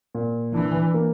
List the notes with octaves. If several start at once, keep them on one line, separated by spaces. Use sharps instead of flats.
A#2
E3 D4
A#3